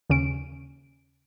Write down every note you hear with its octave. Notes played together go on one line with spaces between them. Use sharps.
D#2 C#3 C#4 D7